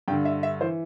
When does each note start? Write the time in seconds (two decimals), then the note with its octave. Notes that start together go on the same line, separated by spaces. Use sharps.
0.08 G2 G5
0.11 D3
0.25 E5
0.43 E5
0.61 E3 C5